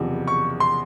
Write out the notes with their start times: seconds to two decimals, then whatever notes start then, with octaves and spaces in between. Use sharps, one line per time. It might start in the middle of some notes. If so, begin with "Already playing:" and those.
Already playing: F#1 E2 C3 F3
0.28 C#6
0.60 C6